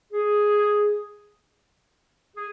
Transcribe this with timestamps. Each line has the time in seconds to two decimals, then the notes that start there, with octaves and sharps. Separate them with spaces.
0.13 G#4
2.36 G#4